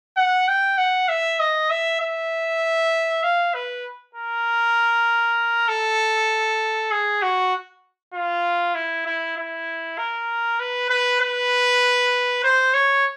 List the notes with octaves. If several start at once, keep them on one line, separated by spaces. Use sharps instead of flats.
F#5
G5
F#5
E5
D#5
E5
E5
F5
B4
A#4
A4
G#4
F#4
F4
E4
E4
E4
A#4
B4
B4
B4
C5
C#5